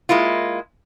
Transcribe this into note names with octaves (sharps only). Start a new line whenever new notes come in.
G#3 A#3 E4 F4